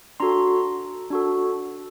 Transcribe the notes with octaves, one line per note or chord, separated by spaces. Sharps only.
D4 F#4 A4 A#5 C6
D4 F#4 A4